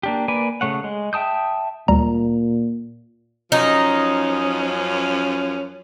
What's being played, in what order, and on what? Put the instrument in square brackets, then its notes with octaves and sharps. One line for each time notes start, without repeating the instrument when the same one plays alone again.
[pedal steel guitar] A#3 D4 G4
A#3 B4 D5 G#5
C#3 A3 C#5 F#5
G#3
E5 G5 A5 D#6 G6
[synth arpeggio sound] D2 G3 A#5 [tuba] A#2
[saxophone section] F#2 F3 C#4 [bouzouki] D#4